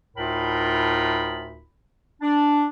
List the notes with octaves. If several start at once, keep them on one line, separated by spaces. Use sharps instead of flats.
D2 A2 D#4 F4 A#4 B5
D4